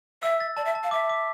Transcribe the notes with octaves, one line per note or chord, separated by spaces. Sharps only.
E5 E6
A6
D5 A5
E5
A5
F5
E5 D6
D6